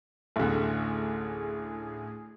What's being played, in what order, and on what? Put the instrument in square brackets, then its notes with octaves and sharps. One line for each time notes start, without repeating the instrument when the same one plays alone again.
[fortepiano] A1 D2 [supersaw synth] A2 G#4